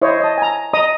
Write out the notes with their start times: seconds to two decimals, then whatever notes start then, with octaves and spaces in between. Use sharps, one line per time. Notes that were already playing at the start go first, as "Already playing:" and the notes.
0.02 E4 C5 C#5 D#5
0.20 D#5 A5
0.38 G#5 A#5
0.74 D#5 A#5 D#6